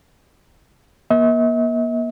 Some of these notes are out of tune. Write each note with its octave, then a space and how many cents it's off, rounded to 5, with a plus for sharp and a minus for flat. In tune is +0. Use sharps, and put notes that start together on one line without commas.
A#3 +40 E5 -45